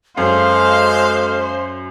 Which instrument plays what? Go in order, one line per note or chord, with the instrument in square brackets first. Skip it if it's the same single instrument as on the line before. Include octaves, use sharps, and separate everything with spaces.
[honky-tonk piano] F#2 [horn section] G#3 F5 [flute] A4 [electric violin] C5